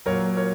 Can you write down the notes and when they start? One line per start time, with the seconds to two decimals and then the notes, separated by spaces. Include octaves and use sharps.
0.06 A#2 F#3 A#4 C#5
0.37 A#4 C#5